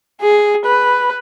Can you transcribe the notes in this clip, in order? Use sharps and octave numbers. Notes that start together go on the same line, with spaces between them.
G#4
B4